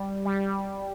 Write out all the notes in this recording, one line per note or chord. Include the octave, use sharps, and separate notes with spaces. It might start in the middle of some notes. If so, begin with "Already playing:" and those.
Already playing: G3
G3